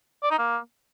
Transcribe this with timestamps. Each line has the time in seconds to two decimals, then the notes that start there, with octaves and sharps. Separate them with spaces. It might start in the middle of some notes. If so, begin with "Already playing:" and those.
0.23 D5
0.31 D#4
0.39 A#3